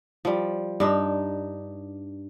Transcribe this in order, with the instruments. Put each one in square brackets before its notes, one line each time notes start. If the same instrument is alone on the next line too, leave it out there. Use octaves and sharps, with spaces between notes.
[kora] F3 G3
G2 D4 D#4